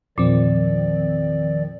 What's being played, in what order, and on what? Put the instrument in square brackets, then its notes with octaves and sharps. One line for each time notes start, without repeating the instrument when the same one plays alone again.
[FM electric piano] E2 F3 C4 [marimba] A#2 [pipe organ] D#3 D5